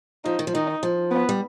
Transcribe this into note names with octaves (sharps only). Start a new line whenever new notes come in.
F3 D#4
D#3
F3
D#3 D#4
F3
B3
G3